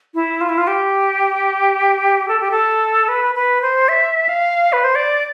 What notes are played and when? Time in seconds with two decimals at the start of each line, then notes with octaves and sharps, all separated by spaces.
0.14 E4
0.41 F4
0.49 E4
0.58 F4
0.67 G4
2.28 A4
2.40 G4
2.51 A4
3.08 B4
3.35 B4
3.62 C5
3.89 E5
4.29 F5
4.73 B4
4.84 C5
4.95 D5